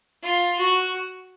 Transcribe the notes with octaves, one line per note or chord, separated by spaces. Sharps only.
F4
F#4